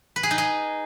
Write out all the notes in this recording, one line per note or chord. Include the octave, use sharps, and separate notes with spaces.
B4
G#4
D#4
G#4